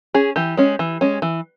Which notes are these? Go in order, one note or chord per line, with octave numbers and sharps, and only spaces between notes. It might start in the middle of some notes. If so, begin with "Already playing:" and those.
C#4 G#4
E3 G4
G#3 C#4
E3
G#3 C#4
E3